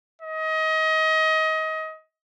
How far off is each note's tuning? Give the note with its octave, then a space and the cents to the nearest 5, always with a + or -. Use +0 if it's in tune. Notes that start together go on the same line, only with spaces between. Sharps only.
D#5 +25